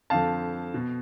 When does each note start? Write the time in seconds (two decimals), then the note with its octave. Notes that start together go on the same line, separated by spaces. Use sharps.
0.10 F2 D3 F3 F5 A5
0.74 B2